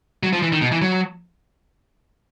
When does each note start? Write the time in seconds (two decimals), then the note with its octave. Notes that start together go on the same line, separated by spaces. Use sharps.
0.23 F#3
0.33 F3
0.42 E3
0.53 D#3
0.62 B2
0.72 E3
0.82 F#3